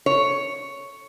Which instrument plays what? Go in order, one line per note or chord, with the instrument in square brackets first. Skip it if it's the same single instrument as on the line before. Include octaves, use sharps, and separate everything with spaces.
[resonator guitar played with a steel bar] C#5